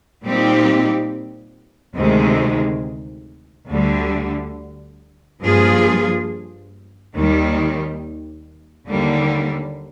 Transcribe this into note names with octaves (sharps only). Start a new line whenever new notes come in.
A#2 G3 C4 D#4 G4
D2 C3 D#3 G#3
D2 D3 G3
G2 F3 A#3 F4 G#4
D#2 D#3 G3
D#2 D3 G3 A#3